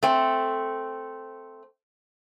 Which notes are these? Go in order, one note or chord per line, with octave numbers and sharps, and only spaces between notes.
A3 C4